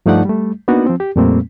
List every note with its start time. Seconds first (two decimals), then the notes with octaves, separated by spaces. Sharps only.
0.06 G2 F3 A3 D#4 D5 F#5
0.25 G3 A3
0.68 A#3 B3 D4 D#4 F#4
0.86 F3 C4
1.00 G4
1.16 F2 A#2 G3 A3 A#3 C4